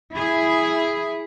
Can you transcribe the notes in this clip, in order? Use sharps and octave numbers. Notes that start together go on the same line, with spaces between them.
E4 G#4